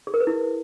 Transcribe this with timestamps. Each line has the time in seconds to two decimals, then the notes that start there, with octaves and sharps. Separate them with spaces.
0.07 G#4
0.14 A#4
0.20 B4
0.27 E4